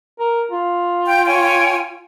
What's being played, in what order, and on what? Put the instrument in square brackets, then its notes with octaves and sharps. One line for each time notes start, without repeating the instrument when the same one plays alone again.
[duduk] A#4
F4
[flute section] G5 G6
C#5 G5 G#5